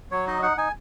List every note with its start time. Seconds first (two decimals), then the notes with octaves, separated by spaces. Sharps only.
0.11 F#3 C#5
0.27 D#4 D#5
0.42 D#4 F#5
0.57 D#4 G#5